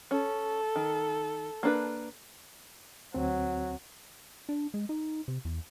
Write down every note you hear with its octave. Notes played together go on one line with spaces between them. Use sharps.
C#4 A4
D#3
A#3 D4 B4
D2 F#3 C4
D4
G#3
D#4
C3
E2